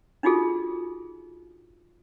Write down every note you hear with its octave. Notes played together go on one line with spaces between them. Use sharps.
D4 D#4 F4 F#4 G#4 A4